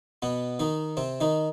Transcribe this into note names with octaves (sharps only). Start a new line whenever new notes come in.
B2 B3
D#3 D#4
C3 C4
D#3 D#4